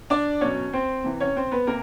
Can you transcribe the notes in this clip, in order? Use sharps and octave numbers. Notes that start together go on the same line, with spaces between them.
D4 D5
B2 F#3 C#4 C#5
C4 C5
C3 E3
C#4 C#5
C4 C5
B3 B4
C3 A#3 A#4